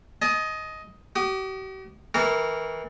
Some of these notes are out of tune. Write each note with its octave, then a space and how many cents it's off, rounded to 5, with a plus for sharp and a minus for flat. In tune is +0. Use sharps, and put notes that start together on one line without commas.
D#5 +10 A5 -40
G4 -45 D#6 -25
E3 -30 A#4 -15 D6 -45